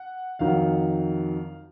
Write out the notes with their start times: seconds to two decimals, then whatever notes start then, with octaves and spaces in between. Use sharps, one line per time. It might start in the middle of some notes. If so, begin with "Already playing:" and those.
Already playing: F#5
0.39 F2 D#3 F#3 F5